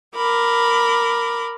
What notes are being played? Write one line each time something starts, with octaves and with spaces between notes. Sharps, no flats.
A#4 B5 D6